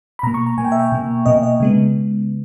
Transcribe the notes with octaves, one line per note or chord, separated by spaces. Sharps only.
B5
B2 A#3 A#5
C#6
A#5
B2 A#3 G#5
G5
E5
G5
B2 A#3
B2 A#3 D#5
D#5
C#3 G#3 B3